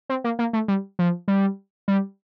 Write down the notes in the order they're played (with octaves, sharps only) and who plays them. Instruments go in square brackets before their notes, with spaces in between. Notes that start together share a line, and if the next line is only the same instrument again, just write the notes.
[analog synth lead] C4
A#3
A#3
A3
G3
F3
G3
G3